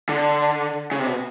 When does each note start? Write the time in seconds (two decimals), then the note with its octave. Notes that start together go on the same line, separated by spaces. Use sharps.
0.09 D3
0.91 C#3
0.99 C3
1.07 B2